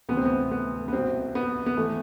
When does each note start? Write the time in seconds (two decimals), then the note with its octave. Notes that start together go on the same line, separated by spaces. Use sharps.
0.09 D2 C3 E3 B3
0.17 C4
0.26 B3
0.51 B3
0.88 B3
0.93 C2 B2 C4
1.35 B3
1.66 B3
1.77 E3 A3